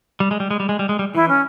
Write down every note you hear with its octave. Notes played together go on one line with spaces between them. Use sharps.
G3
G#3
G3
G#3
G3
G#3
G3
G#3
G3
E3 E4
C#4